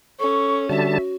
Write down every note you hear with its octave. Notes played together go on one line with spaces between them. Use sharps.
C#4 A4 C#6
D3 G3 F#4 E5 A5